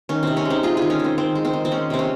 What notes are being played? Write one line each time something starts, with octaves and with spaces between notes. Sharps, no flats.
D#3 C#4
C3 C4
C#4
G#3
C4 D#4
G#3 F4 G#4
D#3 F4 G#4
C#4
D#3 C4
D#3 C4
G#3
C4
D#3
C4
G#3 C#4
C3 C4
C#4